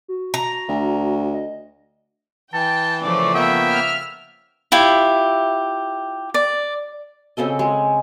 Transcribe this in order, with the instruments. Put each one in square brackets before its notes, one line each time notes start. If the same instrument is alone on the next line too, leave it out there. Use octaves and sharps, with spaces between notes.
[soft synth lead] F#4
[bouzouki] A#5
[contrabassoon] D2
[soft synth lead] D#5
[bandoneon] E3 [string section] G5 [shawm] A5
[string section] C#3 F3 A3 [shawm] D5
[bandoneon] A#3 B3 G5 [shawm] E5
[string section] F6
[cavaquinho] E4 F4 G4 E5
D5
[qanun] C#3 C4 A4 D#5
G#3